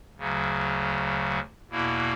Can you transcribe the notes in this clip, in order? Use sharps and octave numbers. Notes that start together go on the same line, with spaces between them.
D2 C#3 F#3
E2 B2 A#3 E4